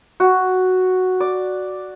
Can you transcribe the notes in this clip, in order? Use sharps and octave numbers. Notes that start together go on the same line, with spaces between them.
F#4
D5